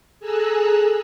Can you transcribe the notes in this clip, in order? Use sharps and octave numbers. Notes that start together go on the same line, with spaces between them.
G#4 A4 G#5 A#5 E6 F#6